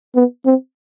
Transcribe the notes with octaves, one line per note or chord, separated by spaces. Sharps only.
B3
C4